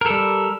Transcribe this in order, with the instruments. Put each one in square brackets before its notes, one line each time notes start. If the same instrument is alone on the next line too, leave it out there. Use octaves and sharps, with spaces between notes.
[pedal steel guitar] A#4
A4
G3